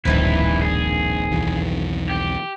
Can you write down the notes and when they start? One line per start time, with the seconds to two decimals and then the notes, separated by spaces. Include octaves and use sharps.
0.05 D1 A#1 G2 D#3 C4 E4 B4
0.62 G#4
1.31 B1 E2 E3
2.10 G4